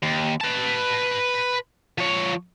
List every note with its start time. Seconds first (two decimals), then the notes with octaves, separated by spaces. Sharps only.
0.02 D#2
0.40 B4 A5
1.98 F3 C#5